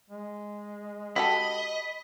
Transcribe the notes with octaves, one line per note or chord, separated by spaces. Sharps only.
G#3
F#4 G4 A4 D#5 B5